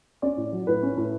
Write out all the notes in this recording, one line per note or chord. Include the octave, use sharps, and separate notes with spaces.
C#4 D5
A2
F#3
A2 B4
C#4
A2